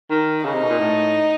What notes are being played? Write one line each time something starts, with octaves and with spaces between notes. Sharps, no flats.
D#3
C#3 D#4
C3
B2
A#2
A2